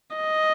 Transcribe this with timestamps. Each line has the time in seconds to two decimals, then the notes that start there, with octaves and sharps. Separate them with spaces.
0.16 D#5